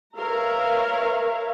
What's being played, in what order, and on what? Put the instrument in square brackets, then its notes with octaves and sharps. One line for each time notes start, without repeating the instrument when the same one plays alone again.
[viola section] A#4 B4 C#5 E5 F5 A#5